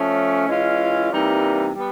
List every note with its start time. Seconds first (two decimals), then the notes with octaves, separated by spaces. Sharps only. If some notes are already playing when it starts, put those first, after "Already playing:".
Already playing: F3 A3 C#4
0.46 E3 G#3 C#4 F4
1.11 C3 E3 G3 A#3 D#4
1.75 G3 B3